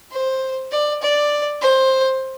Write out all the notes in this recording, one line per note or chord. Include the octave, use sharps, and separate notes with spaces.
C5
D5
D5
C5